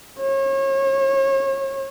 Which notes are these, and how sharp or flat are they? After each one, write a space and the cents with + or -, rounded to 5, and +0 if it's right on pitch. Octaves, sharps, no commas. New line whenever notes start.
C#5 -35